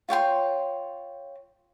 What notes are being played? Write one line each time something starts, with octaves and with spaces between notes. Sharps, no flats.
F4 C#5 G5 C6